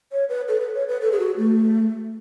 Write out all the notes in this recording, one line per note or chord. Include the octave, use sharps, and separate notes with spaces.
C#5
B4
A4
B4
C#5
B4
A4
G#4
F#4
A3